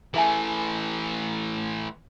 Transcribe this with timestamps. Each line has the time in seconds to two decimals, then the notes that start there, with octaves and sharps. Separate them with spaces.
0.14 E3 A3 G#4 E5 G#5